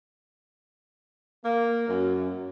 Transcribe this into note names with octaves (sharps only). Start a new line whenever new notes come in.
A#3
F#2